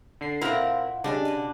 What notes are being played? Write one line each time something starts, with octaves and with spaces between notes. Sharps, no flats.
D3 C7
A#2 C4 E4 A#4 F5 F#5
C#3 G3 D4 D#5 F#5 G#5
B2 F#5 G#5